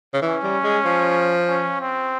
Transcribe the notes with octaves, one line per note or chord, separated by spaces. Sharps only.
C#3
E3 C#4
G3
G#3
F3
C#4
C4